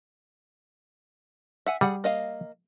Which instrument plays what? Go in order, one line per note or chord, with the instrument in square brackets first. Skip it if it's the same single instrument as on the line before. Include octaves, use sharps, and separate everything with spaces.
[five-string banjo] E5 F#5 G#5
[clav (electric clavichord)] G3 [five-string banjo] G#4 F#5
[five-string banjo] A#3 D#5 F5